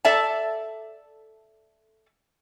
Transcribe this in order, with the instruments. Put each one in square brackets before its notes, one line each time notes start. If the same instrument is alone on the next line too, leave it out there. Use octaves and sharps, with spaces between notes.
[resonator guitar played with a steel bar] A4 D5 E5 A5